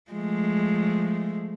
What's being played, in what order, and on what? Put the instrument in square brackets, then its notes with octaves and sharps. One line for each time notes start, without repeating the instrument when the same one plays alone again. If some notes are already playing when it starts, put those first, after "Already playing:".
[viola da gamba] F3 G#3 A3